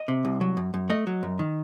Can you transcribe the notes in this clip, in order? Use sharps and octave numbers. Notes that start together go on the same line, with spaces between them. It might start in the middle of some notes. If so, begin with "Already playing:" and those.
Already playing: D#5
C3
C2
F#3
F#2
F#2
A3 D#5
F#3
F#2
D#3